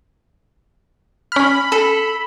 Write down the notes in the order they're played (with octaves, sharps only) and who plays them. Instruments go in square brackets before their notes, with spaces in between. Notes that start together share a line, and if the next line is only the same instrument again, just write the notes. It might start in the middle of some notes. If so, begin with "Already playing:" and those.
[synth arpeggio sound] C#4 F6 [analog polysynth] B5
[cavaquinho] A4